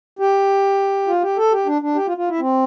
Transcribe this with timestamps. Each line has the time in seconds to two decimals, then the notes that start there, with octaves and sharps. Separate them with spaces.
0.19 G4
1.07 F4
1.22 G4
1.37 A4
1.52 G4
1.66 D4
1.82 D4
1.95 G4
2.07 F4
2.17 F4
2.28 E4
2.40 C4